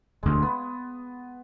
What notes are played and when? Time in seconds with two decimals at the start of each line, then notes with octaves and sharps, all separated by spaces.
0.23 E1 D2 D3 G#3
0.42 B3